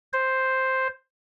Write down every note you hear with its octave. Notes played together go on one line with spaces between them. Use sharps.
C5